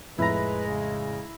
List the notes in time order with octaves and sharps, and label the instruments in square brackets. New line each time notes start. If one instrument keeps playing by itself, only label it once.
[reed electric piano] F2 A2 [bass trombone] G#3 [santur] E4 A#5 [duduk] B4
[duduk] C#3